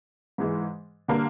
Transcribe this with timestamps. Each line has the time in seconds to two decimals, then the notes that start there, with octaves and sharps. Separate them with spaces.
0.38 G#2 E3 G#3
1.08 D3 G3 A#3 D4